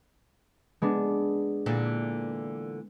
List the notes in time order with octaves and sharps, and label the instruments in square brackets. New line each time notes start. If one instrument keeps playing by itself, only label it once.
[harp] G#3 B3 D4
[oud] A#2 D3 E3